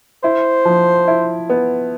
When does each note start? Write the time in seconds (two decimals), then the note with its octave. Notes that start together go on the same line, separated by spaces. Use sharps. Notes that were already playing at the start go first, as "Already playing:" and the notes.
0.23 E4 C5
0.65 F3
1.08 E4
1.50 B3